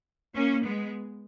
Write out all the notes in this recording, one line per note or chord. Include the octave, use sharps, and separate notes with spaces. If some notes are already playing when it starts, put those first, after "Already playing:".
A#3 C#4
G#3 B3